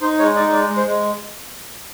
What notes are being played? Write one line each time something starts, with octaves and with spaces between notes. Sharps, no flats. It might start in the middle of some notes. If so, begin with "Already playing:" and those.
D#4 C5
G#3 C#5
D#4 D5
G#3 D5
G#3
C5
G#3